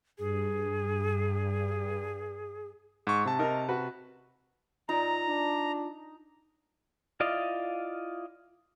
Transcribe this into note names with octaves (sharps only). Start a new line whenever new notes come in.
G2 G#4
G#2 C#6
C3 A5
D#4 A#4
F#4 B4
D#4 F4 D5 A#5
D4
E4 F4 D5 D#5 F5